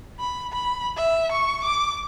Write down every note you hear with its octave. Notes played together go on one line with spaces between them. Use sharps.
B5
B5
E5
C#6
D6